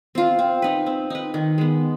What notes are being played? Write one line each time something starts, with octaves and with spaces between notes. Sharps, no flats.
C4 F4
C4
D#4 B4
C4
D#4 B4
D#3
G#3 B3